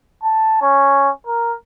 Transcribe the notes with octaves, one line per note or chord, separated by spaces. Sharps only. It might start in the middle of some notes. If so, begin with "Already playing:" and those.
A5
C#4
A#4